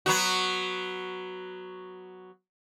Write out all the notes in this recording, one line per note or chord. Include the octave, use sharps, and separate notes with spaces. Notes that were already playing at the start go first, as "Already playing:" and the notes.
F#3 B3 F#4